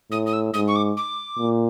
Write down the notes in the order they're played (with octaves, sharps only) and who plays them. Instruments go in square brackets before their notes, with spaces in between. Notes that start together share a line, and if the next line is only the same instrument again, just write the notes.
[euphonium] A2 [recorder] D#6
[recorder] D#6
E6
[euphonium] G#2 [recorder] D#6
[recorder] C#6
D6
D6
[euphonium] A#2